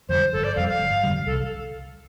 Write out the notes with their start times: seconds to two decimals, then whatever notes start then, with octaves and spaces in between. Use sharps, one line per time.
0.09 F2 D3 G3 C5
0.33 G1 A4
0.44 D5
0.56 F2 D3 G3 F5
0.68 F5
0.80 G1
1.04 F2 D3 G3
1.26 C2 A4